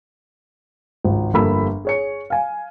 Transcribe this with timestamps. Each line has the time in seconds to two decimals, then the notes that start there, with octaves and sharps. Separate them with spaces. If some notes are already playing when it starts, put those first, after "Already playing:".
1.04 G#1 C#2
1.33 G1 F2 A#3 A4 B5 E6
1.85 G#4 C#5 C#7
2.30 F5 G#5